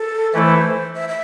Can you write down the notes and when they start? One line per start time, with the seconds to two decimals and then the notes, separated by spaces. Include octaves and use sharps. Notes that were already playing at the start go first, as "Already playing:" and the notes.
Already playing: A4
0.33 E3 A3 E4 A4 C5 E5
0.95 E5
1.09 E5